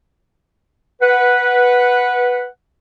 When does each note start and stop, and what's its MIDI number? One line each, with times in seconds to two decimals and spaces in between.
1.01 2.47 71
1.01 2.47 78